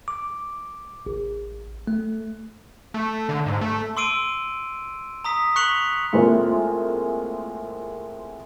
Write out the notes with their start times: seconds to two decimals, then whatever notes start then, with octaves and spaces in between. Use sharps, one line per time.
0.08 D6
1.06 A1
1.87 A3
2.94 A3
3.29 D3
3.46 G#2
3.61 A3
3.97 C6 D6 E6 C7 D7 D#7
5.24 A#5 D#6 B6
5.56 C#6 F#6 B6 C#7 F7 F#7
6.13 A2 G#3 A#3 C4 F4